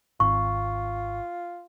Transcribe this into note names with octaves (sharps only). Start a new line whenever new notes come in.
G#1 F4 C#6